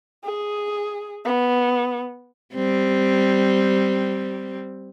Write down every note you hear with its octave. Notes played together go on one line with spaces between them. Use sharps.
G#4
B3
G3 C4